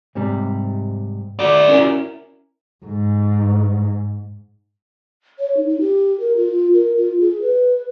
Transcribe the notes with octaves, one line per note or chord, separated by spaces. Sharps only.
G#2 C3 G3
F#4 D5
C#4 E4 A#4
G#2
C#5
D#4
D#4
G4
A#4
F4
A#4
F4
G#4
B4